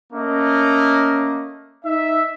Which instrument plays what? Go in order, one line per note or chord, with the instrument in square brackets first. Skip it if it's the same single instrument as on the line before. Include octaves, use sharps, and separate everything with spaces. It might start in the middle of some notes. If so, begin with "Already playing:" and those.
[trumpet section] A3 A#3 D#5 [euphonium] C#4
[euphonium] D#4 [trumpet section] E5